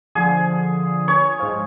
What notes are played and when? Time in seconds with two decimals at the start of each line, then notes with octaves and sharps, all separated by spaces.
0.15 D3 F3 G#4
1.08 C#5
1.40 G#2 F3